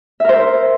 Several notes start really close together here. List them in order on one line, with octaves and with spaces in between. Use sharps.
E5 A#4 C5